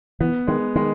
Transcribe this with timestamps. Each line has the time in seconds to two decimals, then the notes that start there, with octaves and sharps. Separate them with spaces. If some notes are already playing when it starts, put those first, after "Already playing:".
0.20 E3 B3
0.47 D#3 G#3
0.76 D#3 G#3